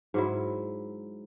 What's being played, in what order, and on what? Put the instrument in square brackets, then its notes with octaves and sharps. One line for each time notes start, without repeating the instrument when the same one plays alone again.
[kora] G#2 F#3 E4